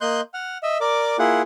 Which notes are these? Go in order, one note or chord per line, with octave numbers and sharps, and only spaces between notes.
A#3 D#5 C6 F#6 G6
F#5 F6
D#5 E5
A#4 D5 D6
A#3 E4 F4 G#4 F#5